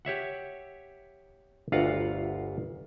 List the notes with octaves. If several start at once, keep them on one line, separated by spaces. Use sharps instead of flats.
G4 C#5 E5 F#5
G1 D2 F4 F5 F#5 A#5